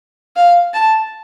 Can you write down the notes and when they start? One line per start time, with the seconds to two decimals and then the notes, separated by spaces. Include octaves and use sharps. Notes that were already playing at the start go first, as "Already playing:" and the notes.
0.36 F5
0.74 A5